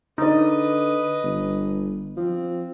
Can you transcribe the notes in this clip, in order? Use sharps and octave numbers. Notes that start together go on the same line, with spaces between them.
D3 D#4 B4 D5 D#5
G1
F3 C4